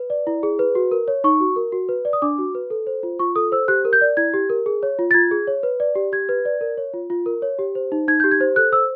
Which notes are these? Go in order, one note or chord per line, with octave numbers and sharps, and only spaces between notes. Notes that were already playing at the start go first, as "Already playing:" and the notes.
Already playing: B4
D5
E4
G#4
B4
F#4
A#4
C#5
D#4 C#6
F#4
A#4
F#4
B4
D5
D#6
D4 D6
F#4
B4
A4
C5
F4
F4 C#6
A4 D#6
C5 E6
G4 F#6
A#4
G6
D5
E4 G#6
G4
A#4
G#4
C#5
F4
A6
F4 G#6
G#4
C#5
B4
D5
G4
G4 G#6
B4
D5
A#4
C#5
F4
F4
A#4
C#5
G4
C5
D#4
D#4 G#6
G4 G6
G#6
C5
A4 F#6
C5 E6